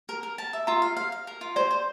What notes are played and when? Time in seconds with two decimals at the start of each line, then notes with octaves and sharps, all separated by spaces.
0.09 A#4
0.23 A#4
0.38 A5
0.53 E5
0.67 F4 A#5
0.82 F5
0.97 F5
1.12 F5
1.27 A#4
1.41 F4
1.56 C5 D5
1.71 C5